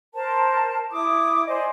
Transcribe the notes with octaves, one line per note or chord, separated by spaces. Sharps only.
A#4 C5 A5
E4 D6 D#6
C5 D5 D#5 G#5